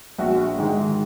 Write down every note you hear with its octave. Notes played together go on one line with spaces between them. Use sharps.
A#1 F#4
G#2 D#3 G#3